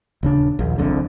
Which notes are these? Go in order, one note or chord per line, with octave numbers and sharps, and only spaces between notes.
D#1 C#3 D4
A#1 D#2
F#1 C2 F2 D3